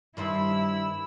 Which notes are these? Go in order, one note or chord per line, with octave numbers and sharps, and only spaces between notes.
G2 D#3 E4 C5 B5 E6